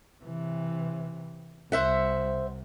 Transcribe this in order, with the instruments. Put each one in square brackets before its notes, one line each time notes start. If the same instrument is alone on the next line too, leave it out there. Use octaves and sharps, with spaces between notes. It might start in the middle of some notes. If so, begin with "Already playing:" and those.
[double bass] C3 E3
[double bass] C2 [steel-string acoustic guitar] C5 E5 F#5